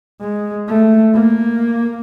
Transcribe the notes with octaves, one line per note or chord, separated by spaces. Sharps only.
G#3
A3
A#3